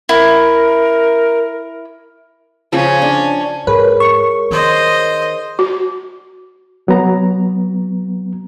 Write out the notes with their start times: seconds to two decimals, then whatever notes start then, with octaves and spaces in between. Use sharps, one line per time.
0.09 E4 A#4
2.73 C#3 F3 C#4
3.02 D4
3.67 G#2 G#4 A#4 B4 C#5
4.00 C#6
4.51 D#3 C5 D#5
5.59 F#4
6.87 C2 F#3 B3 A#5